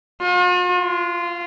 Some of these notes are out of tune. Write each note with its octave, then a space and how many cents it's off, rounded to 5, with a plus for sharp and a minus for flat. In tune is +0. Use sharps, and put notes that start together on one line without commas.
F4 +45
F4 -15